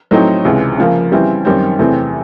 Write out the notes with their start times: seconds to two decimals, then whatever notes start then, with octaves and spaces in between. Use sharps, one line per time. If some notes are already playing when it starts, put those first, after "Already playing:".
0.11 A2 F#3 A3 C4 D#4
0.45 C#2 C3 E3 G#3
0.78 C#3 F3 A#3
1.12 C#3 E3 G3 C4 E4
1.45 F#2 D#3 G3 C4
1.79 E2 C3 E3 A3 C4